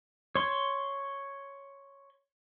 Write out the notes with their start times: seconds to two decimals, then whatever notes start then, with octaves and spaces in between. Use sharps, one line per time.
0.35 C#5 C6